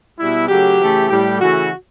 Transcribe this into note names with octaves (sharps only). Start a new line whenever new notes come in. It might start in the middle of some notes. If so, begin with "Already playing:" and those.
B2 G3 E4
C#3 F#3 A3 G4
C#3 E3 A3
A2 G3 G4
C#3 E3 A3 F#4